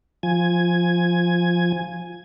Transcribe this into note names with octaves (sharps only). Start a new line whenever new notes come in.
F3 G#5